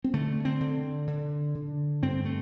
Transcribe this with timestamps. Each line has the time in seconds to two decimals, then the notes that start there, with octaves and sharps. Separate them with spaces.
0.04 C4
0.13 D3 A3
0.45 C4
0.60 D3
1.07 D3
1.55 D3
2.02 G2 C4
2.25 A3